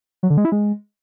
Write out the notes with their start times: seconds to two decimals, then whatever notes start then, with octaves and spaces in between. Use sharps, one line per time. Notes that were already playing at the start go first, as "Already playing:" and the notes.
0.23 F#3
0.30 D3
0.37 G#3
0.45 E4
0.52 G#3